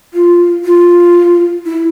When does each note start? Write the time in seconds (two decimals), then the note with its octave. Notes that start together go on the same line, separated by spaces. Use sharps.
0.14 F4
0.65 F4
1.66 E4